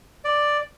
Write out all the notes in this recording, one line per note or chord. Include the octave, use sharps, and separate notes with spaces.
D5